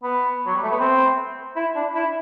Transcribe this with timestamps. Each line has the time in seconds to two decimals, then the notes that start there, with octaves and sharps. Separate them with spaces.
0.03 B3
0.46 F#3
0.55 G3
0.63 A3
0.71 B3
0.80 C4
1.56 E4
1.76 D4
1.95 E4